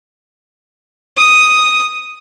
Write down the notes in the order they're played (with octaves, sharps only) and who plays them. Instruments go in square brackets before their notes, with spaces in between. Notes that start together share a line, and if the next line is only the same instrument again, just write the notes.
[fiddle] D#6